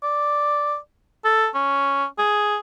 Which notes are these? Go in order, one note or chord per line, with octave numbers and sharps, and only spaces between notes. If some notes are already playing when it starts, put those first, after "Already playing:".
D5
A4
C#4
G#4